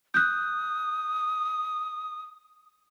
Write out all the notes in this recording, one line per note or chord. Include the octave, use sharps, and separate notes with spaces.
D#6 F#6 G6